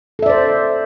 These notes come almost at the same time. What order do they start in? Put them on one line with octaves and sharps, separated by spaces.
A4 E5 D5 C5